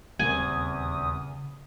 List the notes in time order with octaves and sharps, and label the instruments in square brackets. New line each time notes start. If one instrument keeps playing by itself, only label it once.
[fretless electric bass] D#1 G3 C4 [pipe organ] E2 D#6 [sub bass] C#3 [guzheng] G#5